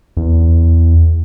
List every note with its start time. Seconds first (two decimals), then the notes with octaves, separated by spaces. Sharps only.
0.17 E2